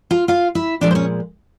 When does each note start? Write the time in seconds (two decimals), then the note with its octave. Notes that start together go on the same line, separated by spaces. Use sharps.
0.11 F4 F5
0.28 F4 F5
0.55 E4 E5
0.81 A#2 F3 G#3 D4 D5
0.91 C5
0.95 C#4 C#5